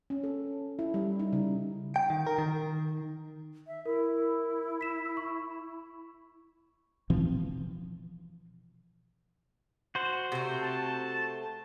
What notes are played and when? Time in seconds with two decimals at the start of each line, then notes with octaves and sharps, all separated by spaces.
0.10 C#4
0.24 A4
0.79 E4
0.94 G3
1.19 D#4
1.33 C#3
1.96 G5
2.10 D#3
2.27 A#4
2.38 D#3
3.67 E5
3.86 E4 A#4
4.81 B6 E7
5.17 C#6
7.10 B2 E3 F3 C4
9.95 F#4 C5
10.32 C3 A3
10.62 A5